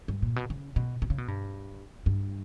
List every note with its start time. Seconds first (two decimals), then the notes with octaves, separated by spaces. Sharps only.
0.08 G2
0.22 A#2
0.36 B2
0.50 C#3
0.76 B2
1.02 B2
1.10 C#3
1.18 B2
1.28 G2
2.06 G2